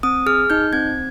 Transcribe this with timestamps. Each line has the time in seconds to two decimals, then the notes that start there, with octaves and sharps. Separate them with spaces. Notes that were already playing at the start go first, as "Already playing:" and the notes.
0.03 C4 D#6
0.26 G#4 F6
0.50 D#4 G6
0.73 C4 G#6